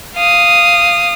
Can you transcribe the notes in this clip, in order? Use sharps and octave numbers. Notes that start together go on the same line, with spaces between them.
F5 D#6